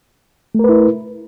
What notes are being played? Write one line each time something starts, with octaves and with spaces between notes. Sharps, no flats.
A3 E4 A#4 B4